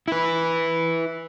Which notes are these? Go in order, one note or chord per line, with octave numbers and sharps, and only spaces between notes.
E4 B4